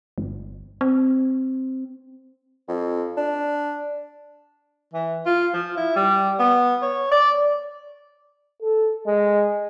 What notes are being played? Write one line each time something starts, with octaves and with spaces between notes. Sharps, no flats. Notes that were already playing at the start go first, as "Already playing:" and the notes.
G1
C4
F2
D4
E3
F4
F3
E4
G3
B3
C#5
D5
A4
G#3